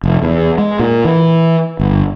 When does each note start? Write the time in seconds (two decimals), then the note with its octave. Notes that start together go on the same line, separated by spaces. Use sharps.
0.03 F1
0.22 E2
0.58 G#3
0.79 A#2
1.05 E3
1.80 G1